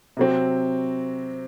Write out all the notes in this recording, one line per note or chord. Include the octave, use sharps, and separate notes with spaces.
C3 F#3 C4